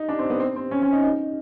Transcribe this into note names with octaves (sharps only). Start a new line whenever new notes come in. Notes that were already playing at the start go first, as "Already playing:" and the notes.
Already playing: D#4
D4
C4
B3
C4
C4
C#4
C#4
D#4
D#4